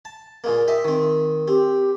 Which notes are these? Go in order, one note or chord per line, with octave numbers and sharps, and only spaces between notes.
A5
A#2 G#3 A#3
G4 D#5 E5
D#3 C4
C4 G4